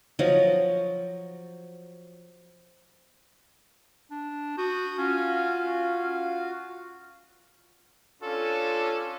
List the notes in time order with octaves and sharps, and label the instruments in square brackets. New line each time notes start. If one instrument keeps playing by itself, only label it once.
[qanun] F3 F#3 D#5
[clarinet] D4
[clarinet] F#4 [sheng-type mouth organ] D#6 G6
[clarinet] C#4 [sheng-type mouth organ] F4 F#4 F5
[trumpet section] C#4 D4 F4 A4